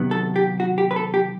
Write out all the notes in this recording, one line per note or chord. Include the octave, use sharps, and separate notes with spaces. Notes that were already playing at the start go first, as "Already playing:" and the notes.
Already playing: C3 D#3 F#3 B3
A4
G4
F#4
G4
B4
A4
G4